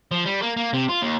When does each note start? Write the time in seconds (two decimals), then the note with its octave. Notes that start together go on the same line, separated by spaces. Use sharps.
0.11 F3
0.25 G3
0.42 A#3
0.57 A#3
0.73 C3
0.89 F4
1.02 D#2